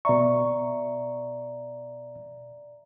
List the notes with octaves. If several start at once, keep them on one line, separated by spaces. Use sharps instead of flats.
B2 D5 E5 A#5 C#6